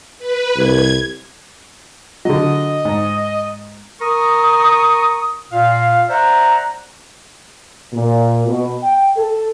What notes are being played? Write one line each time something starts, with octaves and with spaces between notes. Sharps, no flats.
B4
C2 G#6
D3 F#3 D#5
G#2
A#4 A#5 C#6 D#6
A#2 F5
C5 D5 E5 F#5 A#5
A#2
B2
G5
A4